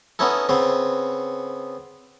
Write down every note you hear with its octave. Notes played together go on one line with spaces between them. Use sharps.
B3 C#4 D#4 E4 A4
C#3 B3 C4